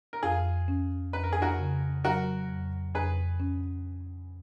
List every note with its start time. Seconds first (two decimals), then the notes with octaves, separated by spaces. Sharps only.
0.13 A#4
0.23 F2 F4 G#4
0.68 C#4
1.13 F2 B4
1.24 A#4
1.32 G#4
1.42 F#4 A#4
1.59 C#3
2.04 F#3 F#4 A#4
2.49 F2
2.95 F2 G#4 B4
3.40 C#4